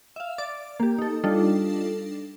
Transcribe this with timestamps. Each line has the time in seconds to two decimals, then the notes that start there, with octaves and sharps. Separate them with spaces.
0.16 E5 F5
0.38 D5 D6 A6
0.80 A#3 G4
0.99 D#4 A4
1.24 G3 D4 D#4 F4 A4